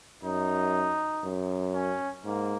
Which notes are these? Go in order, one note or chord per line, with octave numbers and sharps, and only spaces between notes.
F#2 D#4
F#2
C#4
G#2 A#3